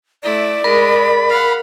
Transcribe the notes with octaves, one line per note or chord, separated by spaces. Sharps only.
A3 E4 D5
G#3 A#4 B5
F5 F#5